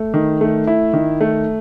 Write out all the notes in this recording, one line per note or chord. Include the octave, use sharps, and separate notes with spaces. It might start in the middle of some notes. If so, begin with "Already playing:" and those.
Already playing: A3
D#3
A3
E4
D#3
A3